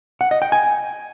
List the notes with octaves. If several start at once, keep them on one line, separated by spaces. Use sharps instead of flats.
F#5
D#5
G5
G#5